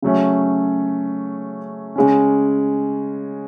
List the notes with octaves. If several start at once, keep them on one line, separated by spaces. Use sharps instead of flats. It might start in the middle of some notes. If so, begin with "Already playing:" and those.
C#3 F#3 A3 C#4
C#3 G#3 C#4